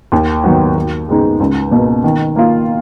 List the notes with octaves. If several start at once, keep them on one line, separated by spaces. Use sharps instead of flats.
D#2
D#3 F#3 B3 F#4
D#2
C#3 G#3 B3 D#4
C#2
B2 A#3
D#3
A#3 F4